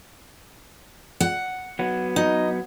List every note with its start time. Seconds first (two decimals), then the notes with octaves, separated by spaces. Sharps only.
1.20 F#5
1.79 F#3 B3
2.16 D#4